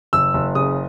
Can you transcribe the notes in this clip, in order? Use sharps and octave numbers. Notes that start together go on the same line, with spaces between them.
F#1 E6
F#1
C#3 D#6